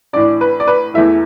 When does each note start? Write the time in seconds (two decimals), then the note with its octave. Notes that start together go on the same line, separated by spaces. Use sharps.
0.13 A2 E3 D4 D5
0.41 B4
0.60 D5
0.68 B4
0.94 E2 E3 A3 E4 E5